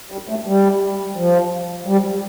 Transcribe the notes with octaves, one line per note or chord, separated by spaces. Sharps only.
G3
A2 A3
G3
F3
G3